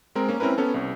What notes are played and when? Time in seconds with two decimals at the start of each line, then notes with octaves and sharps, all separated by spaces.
0.15 G#3 C4 A#4
0.28 A#3 C#4
0.40 C4 C#4 E4 A#4 B4
0.58 B3 C#4 A4
0.74 C2